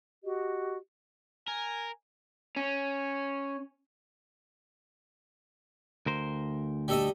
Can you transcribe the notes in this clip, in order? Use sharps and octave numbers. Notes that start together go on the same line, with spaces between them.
F#4 G4 D#5
A#4 G#5
C#4
D2 A#4 C5
G3 A4 D#5